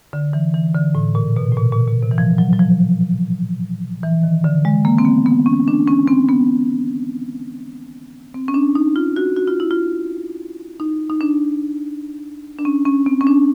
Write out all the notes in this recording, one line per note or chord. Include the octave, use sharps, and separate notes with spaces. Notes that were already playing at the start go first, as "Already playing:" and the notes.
D3
E3
E3
D3
A2
A#2
B2
A2
A#2
A#2
A#2
C3
E3
F3
F#3
F#3
F3
E3
D#3
D3
G#3
A#3
C4
B3
B3
C#4
D4
C#4
C4
B3
C4
C#4
D4
D#4
F4
F#4
F#4
F4
E4
F4
D#4
D#4
D4
D4
C#4
C#4
C4
C#4
D4